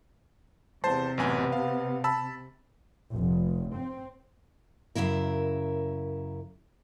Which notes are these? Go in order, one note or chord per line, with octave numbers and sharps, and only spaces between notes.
E2 C3 C5 A5 C6
A1 F#2 B3 G#5
F5
A5 B5 E6
F1
C4
F#2 A2 C#3 E4 A#4